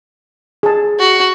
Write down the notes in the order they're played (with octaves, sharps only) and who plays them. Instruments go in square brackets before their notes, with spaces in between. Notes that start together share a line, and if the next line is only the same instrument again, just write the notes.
[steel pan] G#4 A5
[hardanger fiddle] F#4